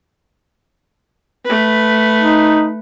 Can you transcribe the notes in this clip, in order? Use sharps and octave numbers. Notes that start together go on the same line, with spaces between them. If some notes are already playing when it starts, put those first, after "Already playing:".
A3 B4
D#4